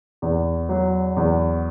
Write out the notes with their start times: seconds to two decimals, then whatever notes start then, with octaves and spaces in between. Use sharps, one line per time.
0.22 E2
0.69 F#3
1.17 E2